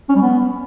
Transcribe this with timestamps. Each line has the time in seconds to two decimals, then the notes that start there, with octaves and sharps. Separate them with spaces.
0.09 C#4
0.15 G3
0.22 B3